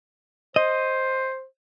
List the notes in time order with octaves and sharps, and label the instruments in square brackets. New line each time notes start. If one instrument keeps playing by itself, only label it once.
[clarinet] C5 [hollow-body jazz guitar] D#5